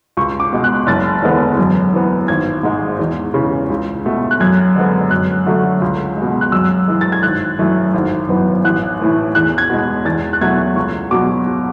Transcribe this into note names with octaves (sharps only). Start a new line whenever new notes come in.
C#2 C#6
D6
B2 G#3
F#6
F#1 A6
E2 D3 G#3 B3
F#2
E3 B3
G#1 G#6
G#2 G#3
E2
C#3 E3
C#2
B2 A3
F#6
F#2 G#6
D3 G#3 B3
F#2 F#6
D3 F#3 A3
C#2
G#3
B2
F#6
F#2 E6
E3 G#3
A6
G#6
G#1 F#6
F#2 E3 A3
G#1
F#2 E3 B3
A1 F#6
A2 E3 A3
E2 F#6
G#6
B2 G#3
E2 A6
F#6
B2 F#3 A3 G#6
C#2 C#6
B2 F#3 D6